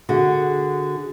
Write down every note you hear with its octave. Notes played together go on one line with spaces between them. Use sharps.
D3 F#4 G#4